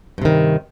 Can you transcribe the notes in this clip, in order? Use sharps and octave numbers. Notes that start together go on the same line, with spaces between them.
G2 C3 D#3